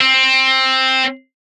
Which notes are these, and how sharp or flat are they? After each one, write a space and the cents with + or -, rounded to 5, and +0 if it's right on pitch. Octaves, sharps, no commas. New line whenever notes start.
C4 +10